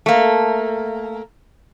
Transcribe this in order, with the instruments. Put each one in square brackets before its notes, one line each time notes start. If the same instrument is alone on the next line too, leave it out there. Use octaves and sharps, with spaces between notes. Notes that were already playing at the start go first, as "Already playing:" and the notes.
[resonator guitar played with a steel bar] A3 A#3